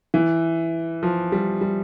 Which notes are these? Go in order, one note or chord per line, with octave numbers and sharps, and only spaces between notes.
E3
F3
G3
G3